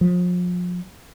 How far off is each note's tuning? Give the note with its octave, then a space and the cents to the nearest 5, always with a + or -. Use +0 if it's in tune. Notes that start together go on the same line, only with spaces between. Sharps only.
F3 +35